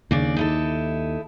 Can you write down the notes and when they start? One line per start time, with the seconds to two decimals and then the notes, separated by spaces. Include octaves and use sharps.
0.11 D#2 C#3 D4 D5
0.36 D#4 E4 A4